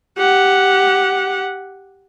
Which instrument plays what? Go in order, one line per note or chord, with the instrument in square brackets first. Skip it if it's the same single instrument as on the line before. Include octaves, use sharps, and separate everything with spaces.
[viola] G4 F#5